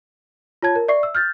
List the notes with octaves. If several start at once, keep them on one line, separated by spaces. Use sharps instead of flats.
F4 C#5 A5 G#6
A#4
D5 E5 C#6 C7
E6
F6 G6 A6